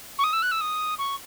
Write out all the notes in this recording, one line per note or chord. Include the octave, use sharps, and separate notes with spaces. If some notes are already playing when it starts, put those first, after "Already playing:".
C#6
D#6
E6
F#6
E6
D#6
C#6